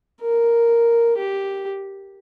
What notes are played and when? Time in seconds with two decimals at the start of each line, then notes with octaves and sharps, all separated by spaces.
0.22 A#4
1.18 G4